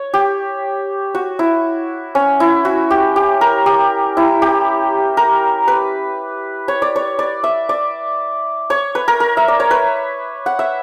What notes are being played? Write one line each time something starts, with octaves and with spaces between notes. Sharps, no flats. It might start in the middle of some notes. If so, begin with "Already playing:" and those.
Already playing: C#5
G4
F#4
E4
C#4
E4
F#4
G4
G4
A#4
G4
E4
G4
A#4
B4
C#5
D5
C#5
D5
E5
D5
C#5
B4
A#4
A#4
E5
D5
C#5
B4
F#5
E5